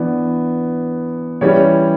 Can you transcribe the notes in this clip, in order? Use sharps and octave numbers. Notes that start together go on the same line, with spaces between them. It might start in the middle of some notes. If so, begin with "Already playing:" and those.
Already playing: E3 B3 D4 D5
E3 G3 C#4 E4 C#5